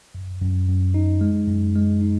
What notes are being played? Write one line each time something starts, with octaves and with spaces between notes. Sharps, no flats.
F#2
F#2
F#2
D#4
G#3
F#2
G#3
D#4